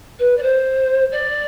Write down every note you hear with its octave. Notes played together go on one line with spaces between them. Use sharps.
B4
D5
C5
D5